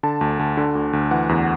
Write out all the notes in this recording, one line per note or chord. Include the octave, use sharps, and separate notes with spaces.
D3 A5
D2
D2
D3
D2
D2
E3 F#5
E2